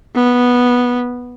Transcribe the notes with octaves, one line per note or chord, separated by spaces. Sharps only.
B3